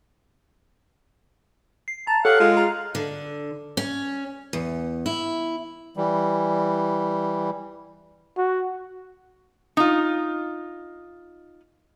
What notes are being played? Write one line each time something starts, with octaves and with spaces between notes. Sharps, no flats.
C7
A5 A#5
G4 A4 C#5 F5 F#5
G#3 F4
A#5
D3
C#4
E2
E4
E3 G3
F#4
D#4 F4